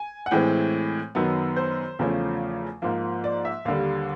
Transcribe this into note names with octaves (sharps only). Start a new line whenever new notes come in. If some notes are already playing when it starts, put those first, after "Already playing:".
Already playing: G#5
F#5
A2 E3 G#3 C4 G5
F#2 D#3 F#3 B3
C5
E2 C#3 F3 A3 C#4
G#2 F3 A#3
D5
E5
D#2 D3 G3 F5